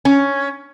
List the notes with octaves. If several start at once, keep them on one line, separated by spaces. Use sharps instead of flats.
C#4